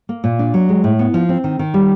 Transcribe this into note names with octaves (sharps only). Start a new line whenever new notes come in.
A#3
A#2
D4
F#3
G#3
A2
B3
F3
C4
D#3
D#3
G3